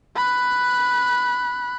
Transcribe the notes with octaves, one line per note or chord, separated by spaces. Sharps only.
B5 F#6